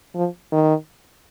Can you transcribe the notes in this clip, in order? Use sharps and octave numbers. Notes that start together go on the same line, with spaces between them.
F3
D#3